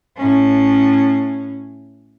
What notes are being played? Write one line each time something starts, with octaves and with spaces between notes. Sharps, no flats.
A2 C#4